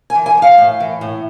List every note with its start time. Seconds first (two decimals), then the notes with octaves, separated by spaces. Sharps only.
0.10 G#5
0.15 E3
0.26 G#5
0.37 A2 F5
0.58 A2
0.80 E3
1.01 A2